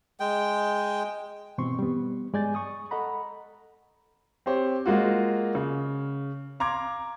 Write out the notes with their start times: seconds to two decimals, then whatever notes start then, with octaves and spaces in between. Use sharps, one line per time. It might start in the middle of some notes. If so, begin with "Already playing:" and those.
0.20 G#3 G5
1.58 G2 B2 E3 C4 C6 C#6
1.79 G3 B3
2.33 G2 G#3 D5 G#5 G6 A6
2.55 C#6 D#6
2.91 A4 D#5 F#5 A#5 B5
4.46 C4 G4 C5 C#5
4.86 G#3 A#3 F4 F#4
5.55 C#3
6.60 F5 A#5 C6 D6 G#6